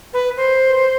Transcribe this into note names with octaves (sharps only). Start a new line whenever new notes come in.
B4
C5